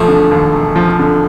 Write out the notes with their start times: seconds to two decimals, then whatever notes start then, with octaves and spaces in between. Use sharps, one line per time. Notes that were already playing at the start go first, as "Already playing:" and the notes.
Already playing: E1 F3 A3
0.08 D3
0.31 D#2
0.53 E1
0.76 F3
0.99 D3